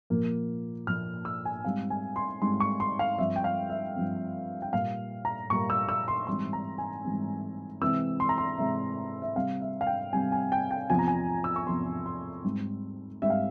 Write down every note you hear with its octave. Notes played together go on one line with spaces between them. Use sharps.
A#2 F3 A#3
A#2 F3 A#3 F6
E6
G#5
G#2 G3 C4 F5
G#5
C6
G#2 G3 C4 C6
C#6
C6
F5
G2 F3 C4 E5
G5
F5
E5
G2 F3 C4
G5
A#2 G3 A#3 F5
A#5
A#2 G3 A#3 C#6
E6
E6
C6
G#2 E3 G3 C4 C6
A#5
G#5
G#2 E3 G3 C4
C3 E3 G#3 C4 E6
C6
A#5
C6
C3 E3 G#3 C4 E5
E5
C3 G3 C4 F5
E5
F5
G5
C3 G3 C4 G#5
G#5
G5
G5
E2 C3 F3 G#5
A#5
G#5
E6
C#6
E2 C3 F3 C6
C6
G#2 G3 C4
G#2 G3 C4 E5
F5